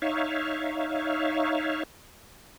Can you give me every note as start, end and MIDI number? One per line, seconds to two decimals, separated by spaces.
0.02 1.83 63
0.02 1.83 73
0.02 1.83 76
0.02 1.83 77